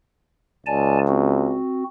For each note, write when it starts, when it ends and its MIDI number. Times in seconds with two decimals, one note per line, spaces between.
0.66 1.57 37
0.66 0.98 74
0.66 0.98 80
0.66 0.98 81
1.08 1.84 60
1.08 1.84 66